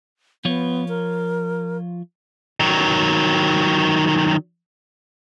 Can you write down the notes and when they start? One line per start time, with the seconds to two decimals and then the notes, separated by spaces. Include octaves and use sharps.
0.45 F3 B3 F4 C#5
0.89 A#4
2.60 D#3 F#3